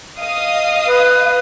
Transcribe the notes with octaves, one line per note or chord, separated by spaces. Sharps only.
D#5 F5 D#6
B4